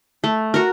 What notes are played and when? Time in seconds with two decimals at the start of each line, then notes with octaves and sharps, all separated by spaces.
0.24 A3
0.54 F#4 A#4